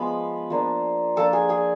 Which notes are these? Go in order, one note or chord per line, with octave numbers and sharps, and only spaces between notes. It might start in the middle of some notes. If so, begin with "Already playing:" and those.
Already playing: F3 G#3 B3 B4 B5
F3 A#3 D4
F3 A#3 D4 A4 A5
G#4 G#5
G#4 G#5